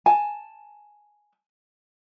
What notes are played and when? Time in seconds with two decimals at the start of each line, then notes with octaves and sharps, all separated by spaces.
0.06 G#5 A5